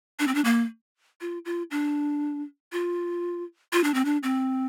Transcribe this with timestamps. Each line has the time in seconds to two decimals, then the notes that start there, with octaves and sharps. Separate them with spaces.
0.19 D4
0.28 C4
0.35 D4
0.45 A#3
1.21 F4
1.45 F4
1.71 D4
2.72 F4
3.73 F4
3.84 D4
3.94 C4
4.05 D4
4.23 C4